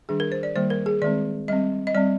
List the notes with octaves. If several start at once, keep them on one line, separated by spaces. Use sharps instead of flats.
D#3 G3 D4 G#4
A#4
C5
D5
D#3 G3 A#3 C5
A#4
G#4
D#3 G#3 C4 D5
G3 C4 D#5
D#5
G3 C4 D5